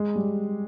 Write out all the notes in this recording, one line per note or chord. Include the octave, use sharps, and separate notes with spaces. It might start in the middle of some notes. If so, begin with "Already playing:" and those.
Already playing: G#3
G3